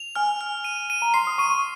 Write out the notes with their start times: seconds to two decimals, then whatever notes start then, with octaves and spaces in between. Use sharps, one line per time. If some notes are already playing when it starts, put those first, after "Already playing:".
Already playing: F7
0.16 G#5 F6
0.41 F6
0.64 D#7
0.90 D#7
1.02 A#5
1.14 C6 C7
1.27 D#6
1.38 C#6 D#7